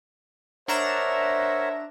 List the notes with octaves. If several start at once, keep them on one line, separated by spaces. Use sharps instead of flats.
D4 A#4 C5 C#5 E5 F#5 A#5 E7